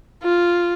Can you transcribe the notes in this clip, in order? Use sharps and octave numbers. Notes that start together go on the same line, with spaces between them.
F4